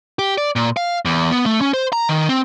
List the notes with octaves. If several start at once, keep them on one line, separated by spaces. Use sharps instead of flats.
G4
D5
A#2
F5
E2
B3
A3
C#4
C5
A#5
D#3
C4